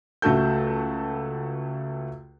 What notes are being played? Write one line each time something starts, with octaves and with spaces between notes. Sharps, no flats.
C#2 A3 F#4 A4 G6